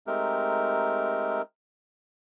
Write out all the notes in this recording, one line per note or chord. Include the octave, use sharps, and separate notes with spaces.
G#3 A3 C4 D#4 G4 A#4